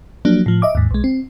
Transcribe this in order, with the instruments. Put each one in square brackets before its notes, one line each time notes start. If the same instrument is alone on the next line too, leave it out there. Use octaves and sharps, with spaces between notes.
[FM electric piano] F3 F#3 A#3 D4
A2 F3
D#5 E5 D6
D#2 G#2
B1 G#3
C4